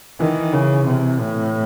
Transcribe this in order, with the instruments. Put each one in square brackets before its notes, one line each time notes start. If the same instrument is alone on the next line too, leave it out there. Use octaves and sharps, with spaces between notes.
[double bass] D#3 [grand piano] E3
[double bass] C#3
C3
A2